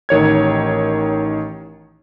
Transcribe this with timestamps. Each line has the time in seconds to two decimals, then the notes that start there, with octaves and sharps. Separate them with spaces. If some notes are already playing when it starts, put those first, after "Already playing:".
0.09 A1 D#3 C#5 G#6